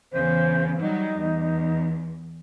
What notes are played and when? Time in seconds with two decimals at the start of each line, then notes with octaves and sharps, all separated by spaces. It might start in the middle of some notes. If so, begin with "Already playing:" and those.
0.12 E2 C#3 C5
0.80 F#3 G3 D#4
1.19 E2